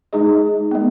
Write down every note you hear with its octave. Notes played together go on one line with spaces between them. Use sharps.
G#3 D#4 G#4 D#5
G#3 B3